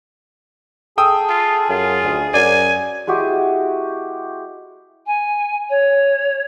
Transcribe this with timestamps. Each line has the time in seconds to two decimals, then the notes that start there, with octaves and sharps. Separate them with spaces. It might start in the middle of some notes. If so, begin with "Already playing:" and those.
0.98 G#4 A4 G5 D#6 E6
1.29 F4
1.69 F#2 F4
2.04 D2
2.34 F#2 D5 G#5
3.07 G#3 E4 F#4 G4
5.07 G#5
5.70 C#5